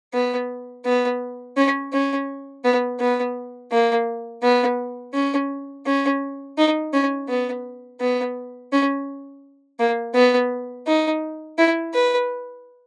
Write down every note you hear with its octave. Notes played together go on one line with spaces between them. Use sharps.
B3
B3
C#4
C#4
B3
B3
A#3
B3
C#4
C#4
D#4
C#4
B3
B3
C#4
A#3
B3
D#4
E4
B4